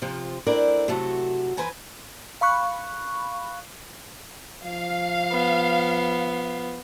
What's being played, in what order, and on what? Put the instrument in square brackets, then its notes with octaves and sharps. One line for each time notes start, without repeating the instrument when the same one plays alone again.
[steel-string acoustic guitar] C3 F3 F4
A3 C4 D4 E4 A#4 D5
C3 F#3 A3 F#4 A4
E3 B4 C5 G#5 A#5
[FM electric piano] F5 B5 C#6 F#6
[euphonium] F3 [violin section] F5
[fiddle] B3